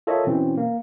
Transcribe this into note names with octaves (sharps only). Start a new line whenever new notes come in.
F4 A4 A#4 C#5 D#5 E5
B2 E3 C4 C#4
A#3